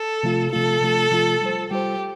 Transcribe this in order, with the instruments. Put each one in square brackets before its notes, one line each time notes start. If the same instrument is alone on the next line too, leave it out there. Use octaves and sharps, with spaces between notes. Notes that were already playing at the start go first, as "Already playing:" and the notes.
Already playing: [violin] A4
[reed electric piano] C3 F3 A3 F4
[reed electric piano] C3 F3 A3 F4 [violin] A4
[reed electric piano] C3 F3 A3 F4
C3 F3 A3 F4
G3 F4 C5
[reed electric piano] G3 F4 C5 [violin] G4